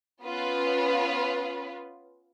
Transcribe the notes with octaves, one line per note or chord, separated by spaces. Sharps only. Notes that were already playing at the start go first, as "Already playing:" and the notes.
B3 C#4 F4 B4